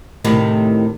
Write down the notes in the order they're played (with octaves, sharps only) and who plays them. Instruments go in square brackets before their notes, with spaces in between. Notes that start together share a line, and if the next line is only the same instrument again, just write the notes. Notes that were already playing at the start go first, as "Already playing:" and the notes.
[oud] A2 C3 D#3